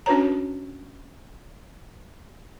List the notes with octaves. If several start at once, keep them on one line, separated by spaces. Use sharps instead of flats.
C#4 D4 F#4 B4 C#5 A#5